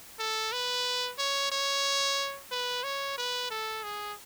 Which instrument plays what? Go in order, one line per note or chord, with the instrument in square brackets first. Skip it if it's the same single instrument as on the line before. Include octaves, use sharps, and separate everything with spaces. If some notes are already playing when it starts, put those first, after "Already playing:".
[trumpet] A4
B4
C#5
C#5
B4
C#5
B4
A4
G#4